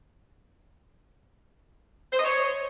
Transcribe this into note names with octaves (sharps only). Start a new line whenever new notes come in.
C5
D#5
C#5